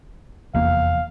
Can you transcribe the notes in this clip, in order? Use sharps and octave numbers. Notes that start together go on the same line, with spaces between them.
F1 E2 A#3 F5